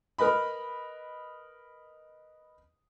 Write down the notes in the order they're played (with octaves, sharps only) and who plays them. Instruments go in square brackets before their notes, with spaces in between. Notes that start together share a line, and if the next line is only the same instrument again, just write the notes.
[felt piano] A#4 B4 D#5 B5